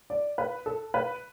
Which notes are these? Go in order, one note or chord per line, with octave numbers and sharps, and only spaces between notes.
D5
B4
A4
B4